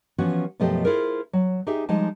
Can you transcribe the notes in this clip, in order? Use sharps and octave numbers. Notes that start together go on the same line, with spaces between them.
E3 F3 B3 C#4 F#4
F#2 B2 F3 A3 G4 D#5
E4 F4 G#4 A#4 C5
F#3
D#4 G4 G#4 E5 G#5
F3 G3 G#3 D#4 A5